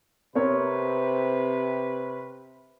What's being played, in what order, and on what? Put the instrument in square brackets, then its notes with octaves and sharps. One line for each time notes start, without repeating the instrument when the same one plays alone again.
[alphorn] C3 [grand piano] C4 A#4 C#5 [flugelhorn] B4